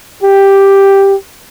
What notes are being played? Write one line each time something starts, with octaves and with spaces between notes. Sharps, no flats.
G4